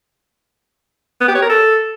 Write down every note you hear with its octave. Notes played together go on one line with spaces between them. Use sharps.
B3
G4
C#5
A#4
A4